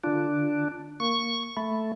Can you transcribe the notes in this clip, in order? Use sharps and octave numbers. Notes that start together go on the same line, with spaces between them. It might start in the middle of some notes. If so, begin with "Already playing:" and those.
D3 D4 F4
A#3 C#6
A3 B5